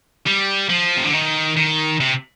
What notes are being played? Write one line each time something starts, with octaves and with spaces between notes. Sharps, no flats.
G3
F3
C3
D3
D#3
D#3
C3